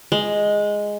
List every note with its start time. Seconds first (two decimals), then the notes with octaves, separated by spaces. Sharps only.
0.12 G#3